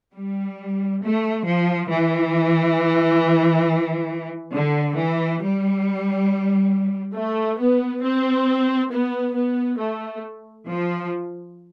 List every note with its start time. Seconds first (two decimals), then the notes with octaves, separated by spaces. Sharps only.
0.14 G3
1.01 A3
1.46 F3
1.89 E3
4.52 D3
4.96 E3
5.40 G3
7.15 A3
7.59 B3
8.03 C4
8.91 B3
9.35 B3
9.79 A3
10.66 F3